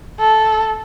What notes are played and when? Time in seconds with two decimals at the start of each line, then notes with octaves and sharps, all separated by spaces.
0.20 A4